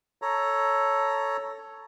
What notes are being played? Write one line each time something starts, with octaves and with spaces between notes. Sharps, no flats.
A4 C#5 A#5